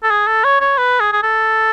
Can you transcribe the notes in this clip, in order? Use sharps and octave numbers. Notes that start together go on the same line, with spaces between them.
A4
G#4
A4
C#5
C#5
B4
G#4
G#4
A4